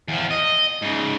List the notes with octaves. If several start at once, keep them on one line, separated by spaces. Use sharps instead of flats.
E2 F3
D#5
G#2 C#3